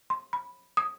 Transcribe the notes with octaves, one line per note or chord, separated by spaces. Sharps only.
C6
B5
D#6